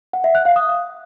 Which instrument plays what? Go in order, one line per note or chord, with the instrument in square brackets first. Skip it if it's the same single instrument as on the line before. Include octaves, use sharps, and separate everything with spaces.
[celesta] F#5
E5
F#6
F5
D#6